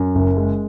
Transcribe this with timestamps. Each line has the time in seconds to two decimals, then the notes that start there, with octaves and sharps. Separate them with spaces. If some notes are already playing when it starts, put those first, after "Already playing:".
Already playing: F#2
0.15 F#1
0.37 G#3